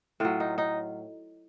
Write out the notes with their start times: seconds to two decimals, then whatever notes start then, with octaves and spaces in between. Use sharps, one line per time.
0.20 A2 F#3 F4
0.40 D#4
0.58 D#4